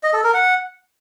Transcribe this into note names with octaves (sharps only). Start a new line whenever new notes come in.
D#5
A4
A#4
F#5